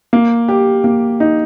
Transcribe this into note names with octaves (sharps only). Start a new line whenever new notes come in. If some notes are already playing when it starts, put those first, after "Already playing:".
A#3
G4
A#3
D#4